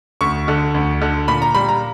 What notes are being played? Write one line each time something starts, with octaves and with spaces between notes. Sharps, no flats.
D2 C#6
D3
D2
D3
A#2 B5
A#5
G3 B5
A#5